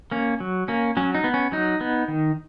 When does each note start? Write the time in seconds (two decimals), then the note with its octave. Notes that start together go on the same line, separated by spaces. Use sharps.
0.11 A#3 C#4
0.40 F#3
0.68 A#3 C#4
0.97 F#3 C#4
1.14 D#4
1.24 B3
1.34 C#4
1.52 F#3 D#4
1.81 B3
2.08 D#3